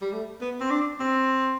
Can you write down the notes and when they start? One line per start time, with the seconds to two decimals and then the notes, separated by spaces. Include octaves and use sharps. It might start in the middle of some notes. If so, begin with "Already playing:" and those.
0.01 G3
0.13 A3
0.41 B3
0.61 C4
0.70 D4
1.00 C4